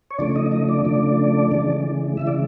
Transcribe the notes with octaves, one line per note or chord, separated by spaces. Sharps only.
C#5
C#3 F3 A3 D4 D5
D#4 D#5
D#4 D#5
D4 D5
C#3 F3 A3
C#3 E3 G#3
C#3 E3 G#3 E4 E5
D5